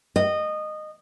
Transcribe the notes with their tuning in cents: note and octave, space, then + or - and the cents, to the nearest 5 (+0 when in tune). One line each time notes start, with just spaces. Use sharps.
D#5 -20